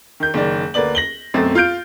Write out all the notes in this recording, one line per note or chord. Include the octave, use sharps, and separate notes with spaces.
D#3 G6
F#1 D#3 D5
D2 A#3 B4 D5 F#7
A#6 F#7 G7
B1 F#2 A3 C4 A6
F4 F6 G6 D7